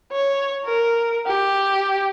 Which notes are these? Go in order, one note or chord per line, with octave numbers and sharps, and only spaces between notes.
C#5
A#4
G4